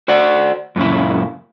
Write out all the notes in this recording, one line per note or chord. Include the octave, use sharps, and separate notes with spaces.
F#4 C5 D5 F#5
F#2 A#2 C#3 E4